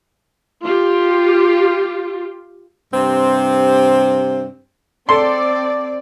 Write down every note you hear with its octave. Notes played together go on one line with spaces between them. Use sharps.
F4 G4
G2 C3 C4 C5
C4 A4 D5 C6